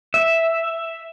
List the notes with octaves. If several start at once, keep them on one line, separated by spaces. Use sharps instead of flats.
E5